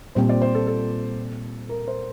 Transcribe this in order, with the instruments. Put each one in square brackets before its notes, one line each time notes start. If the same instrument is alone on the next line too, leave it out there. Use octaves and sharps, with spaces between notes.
[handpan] A#2 G3 C4 [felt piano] C5
[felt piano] D5
C5
A4
A4
A#4
C5